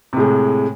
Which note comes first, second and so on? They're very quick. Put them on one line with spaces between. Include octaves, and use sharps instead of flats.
C3 A2 G#3